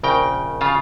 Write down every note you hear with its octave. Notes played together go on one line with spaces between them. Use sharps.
A#1 C#3 A#4 G5
C#3 F4 F5 A5